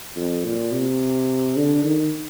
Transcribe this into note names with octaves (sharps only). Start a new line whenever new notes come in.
F2
A#2
C3
D3
D#3